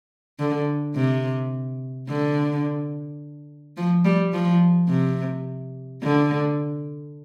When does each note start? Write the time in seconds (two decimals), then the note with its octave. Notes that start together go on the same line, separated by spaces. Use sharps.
0.39 D3
0.96 C3
2.08 D3
3.77 F3
4.05 G3
4.33 F3
4.89 C3
6.02 D3